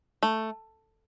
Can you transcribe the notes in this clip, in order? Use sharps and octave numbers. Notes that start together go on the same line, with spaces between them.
A3